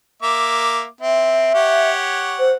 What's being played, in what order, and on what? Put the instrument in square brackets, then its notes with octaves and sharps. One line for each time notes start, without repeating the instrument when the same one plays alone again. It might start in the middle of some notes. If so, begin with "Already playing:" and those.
[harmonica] A#3 E5 D6
[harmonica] C4 [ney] E5
[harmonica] G4 C#5 F#5
[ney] C5